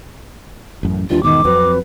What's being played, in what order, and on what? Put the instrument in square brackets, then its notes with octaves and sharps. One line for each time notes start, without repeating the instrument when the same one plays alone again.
[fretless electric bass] A1 F#2
[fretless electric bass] D#2 E3 G3 [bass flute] D4 [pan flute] F4
[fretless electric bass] E2 G#2 B2 [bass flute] D#3 [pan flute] D6
[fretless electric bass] F2 F#3 C4 [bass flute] B4